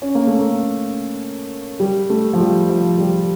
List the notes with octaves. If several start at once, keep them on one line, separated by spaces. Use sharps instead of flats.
C#4
A#3
A3
A#3
G3
A3
F3
G3
F3
G3